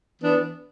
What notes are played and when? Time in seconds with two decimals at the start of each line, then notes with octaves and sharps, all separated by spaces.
0.21 E3 B3 D4